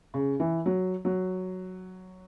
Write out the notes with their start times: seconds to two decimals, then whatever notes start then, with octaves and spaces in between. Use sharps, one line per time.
0.14 C#3
0.40 E3
0.66 F#3
1.05 F#3